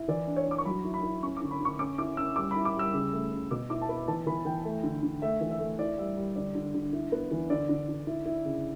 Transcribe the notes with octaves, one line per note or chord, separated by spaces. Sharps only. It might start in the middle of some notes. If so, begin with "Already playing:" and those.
Already playing: E4
E3 D5
D4
C#5
D4 D6
C#6
F#3 B5
E4
B5
E4
C#4 C#6
D3 D6
B5
D3 C#6
C#4 D6
E4 D6
C#4 E6
G3 D6
E4 B5
D6
G3 E6
C#3
A3
C#3
B2 D6
E4 D6
A5
B3 B5
E3 A5
E3 B5
E3 G5
A3
D3
D3
A3 E5
E3
E5
A3
E4 D5
G3 E5
G3
D3 D5
D3
D3
E4
B3
E3
D3 D5
D3
D3
E4
E4
C#3